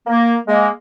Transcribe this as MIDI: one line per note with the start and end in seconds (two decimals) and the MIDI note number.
0.07 0.35 58
0.47 0.68 56
0.47 0.68 58